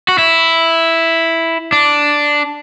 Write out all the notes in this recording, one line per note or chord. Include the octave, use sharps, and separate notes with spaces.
F#4
E4
D4